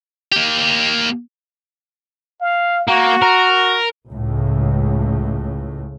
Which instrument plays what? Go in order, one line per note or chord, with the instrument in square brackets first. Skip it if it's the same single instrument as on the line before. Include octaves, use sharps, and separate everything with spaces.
[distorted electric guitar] A#3 G4
[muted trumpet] F5
[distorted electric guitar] A#3 [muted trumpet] F#4
[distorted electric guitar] A#4
[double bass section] C#2 A2